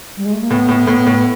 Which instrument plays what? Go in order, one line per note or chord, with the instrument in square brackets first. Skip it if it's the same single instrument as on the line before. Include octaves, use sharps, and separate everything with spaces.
[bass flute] G3
G#3
A3
A#3
[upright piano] A2 [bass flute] B3
[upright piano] A2
A2
A2